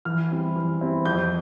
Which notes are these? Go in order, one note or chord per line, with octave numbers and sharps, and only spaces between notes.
E3 F6
G3 C4 E4
E3
G3 C4 E4
F2 G6